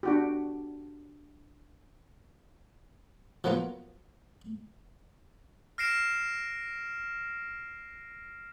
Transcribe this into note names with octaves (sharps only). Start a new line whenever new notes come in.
D4 F#4 G4
F3 F#3 A#3 B3 F4
F6 A#6 C7 D7 E7